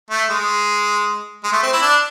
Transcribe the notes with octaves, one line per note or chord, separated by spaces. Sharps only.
A3
G#3
G#3
A3
C4
E4
D4